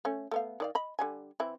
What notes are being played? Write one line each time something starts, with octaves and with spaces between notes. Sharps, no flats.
A3 C#4
A3 B3 F5
D#3 D5 F5
D#5 B5
D3 G3 G#5
E3 C4 E4